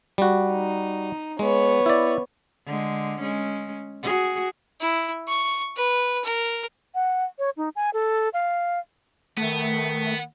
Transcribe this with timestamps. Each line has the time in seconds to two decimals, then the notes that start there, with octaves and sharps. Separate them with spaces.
0.18 G3 F#4
0.51 D#4
1.39 G#3 B3 C#5
1.86 E4 D5
2.66 D3 G#3
3.21 G#3 C#4
4.03 F#4 G#4
4.80 E4
5.28 C#6
5.76 B4
6.24 A#4
6.95 F#5
7.39 C#5
7.57 D#4
7.76 G#5
7.94 A4
8.34 F5
9.37 D#3 A3 B3